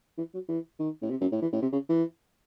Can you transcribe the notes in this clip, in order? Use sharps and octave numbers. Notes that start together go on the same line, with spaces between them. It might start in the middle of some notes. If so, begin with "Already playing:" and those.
E3
F#3
E3
D#3
A2
C3
F#2
A2
E3
A2
C3
C#3
E3